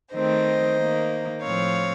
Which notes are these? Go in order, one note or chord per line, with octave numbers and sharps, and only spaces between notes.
D#3 A3 C4 C5 D#5
D#3 A#3
A2 F3 C4 C#5 F5